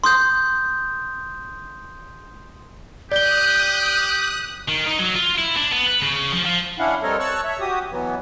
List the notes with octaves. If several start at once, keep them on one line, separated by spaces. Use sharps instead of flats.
C6 D#6 G6
G4 D5 D#6 F#6 G6 G7
D#3
D#4
F#3
F4
E4
D4
B3
B4
C#3
F3
F3
C#4 D4 E4 F5 F#5
G3 C4 A4 A#4 C#5 D#5
C#5 A5 C#6 E6 F#6
C#5 E5
F#4 G4 D#6
B2 E3 F#3 B3